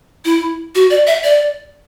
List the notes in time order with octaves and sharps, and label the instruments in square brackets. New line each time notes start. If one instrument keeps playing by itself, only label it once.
[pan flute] E4
F#4
D5
E5
D5